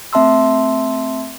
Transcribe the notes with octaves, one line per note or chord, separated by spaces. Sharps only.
A3 C4 E5 A5 C6 E6